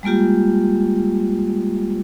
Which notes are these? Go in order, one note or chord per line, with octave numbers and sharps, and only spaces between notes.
G3 G#3 A#3 F4 G4